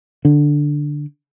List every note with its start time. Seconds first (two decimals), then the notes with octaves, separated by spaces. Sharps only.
0.25 D3